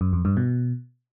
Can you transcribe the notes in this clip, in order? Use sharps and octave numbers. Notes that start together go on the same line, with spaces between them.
F#2
F2
G2
B2